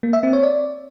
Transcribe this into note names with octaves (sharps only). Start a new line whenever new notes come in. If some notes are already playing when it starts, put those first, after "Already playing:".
A#3
E5
C4
C#5
D5